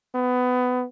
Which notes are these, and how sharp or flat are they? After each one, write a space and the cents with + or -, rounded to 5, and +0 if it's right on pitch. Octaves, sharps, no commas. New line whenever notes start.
B3 +20